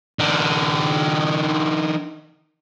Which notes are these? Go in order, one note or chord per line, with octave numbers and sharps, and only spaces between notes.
D#3 D4